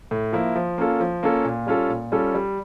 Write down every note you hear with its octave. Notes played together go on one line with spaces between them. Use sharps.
A2
F3 A#3 E4
F3
A#3 C#4 F4 A4
F3
A#3 C#4 F4 A4
A#2
G3 C#4 F4 A4
A#2
G3 C#4 F4 A4
G3